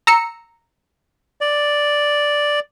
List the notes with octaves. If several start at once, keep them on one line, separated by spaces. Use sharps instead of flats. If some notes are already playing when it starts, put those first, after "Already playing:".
A#5 E6 C#7
D5